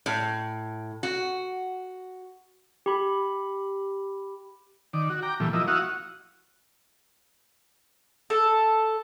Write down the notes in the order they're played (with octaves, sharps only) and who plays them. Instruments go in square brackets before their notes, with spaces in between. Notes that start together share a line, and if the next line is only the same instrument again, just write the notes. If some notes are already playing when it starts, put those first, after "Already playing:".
[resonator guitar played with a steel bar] A2
F#4
[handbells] G4 B5
[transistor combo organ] D#3 D5
F#4
G5 A#5 D6
A#2 E3 G3 A3
F3 A#3 E4 D#5
E4 F#4 F5 F#5 C#6 D#6
[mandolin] A4